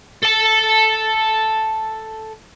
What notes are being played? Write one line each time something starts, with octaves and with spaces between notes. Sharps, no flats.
A4 A5